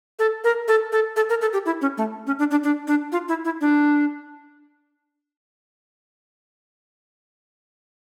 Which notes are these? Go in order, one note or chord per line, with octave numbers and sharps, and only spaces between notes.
A4
A#4
A4
A4
A4
A#4
A4
G4
E4
C#4
A3
C#4
D4
D4
D4
D4
F4
E4
E4
D4